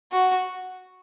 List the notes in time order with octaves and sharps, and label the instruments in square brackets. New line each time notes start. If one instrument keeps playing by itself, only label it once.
[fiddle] F#4